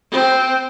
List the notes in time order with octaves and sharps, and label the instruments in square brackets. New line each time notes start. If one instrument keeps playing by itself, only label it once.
[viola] C4